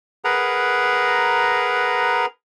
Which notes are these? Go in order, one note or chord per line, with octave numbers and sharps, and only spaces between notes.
G#4 A#4 B4 F#5 A#5